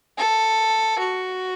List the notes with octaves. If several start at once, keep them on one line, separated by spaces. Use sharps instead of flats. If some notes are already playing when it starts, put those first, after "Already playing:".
A4
F#4